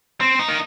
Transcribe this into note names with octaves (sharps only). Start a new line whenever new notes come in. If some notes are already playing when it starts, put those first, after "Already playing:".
C4
D#4
A#3